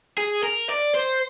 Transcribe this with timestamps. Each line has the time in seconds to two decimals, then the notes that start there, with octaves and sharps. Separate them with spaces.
0.18 G#4
0.43 A#4
0.69 D5
0.95 C5